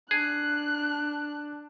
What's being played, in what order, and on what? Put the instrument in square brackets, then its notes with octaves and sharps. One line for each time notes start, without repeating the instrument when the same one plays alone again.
[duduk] D4 [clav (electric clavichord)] G#4 [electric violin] F#6